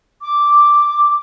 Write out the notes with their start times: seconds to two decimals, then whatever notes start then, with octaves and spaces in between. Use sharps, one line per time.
0.22 D6